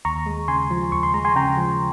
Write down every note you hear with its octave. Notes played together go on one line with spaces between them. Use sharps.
D#2 A#5 C#6
G#3
C#3 G#5 C6
F3
D#2 C#6
C6
G#3 A#5
G#5 C6
C#3 G5 A#5
F3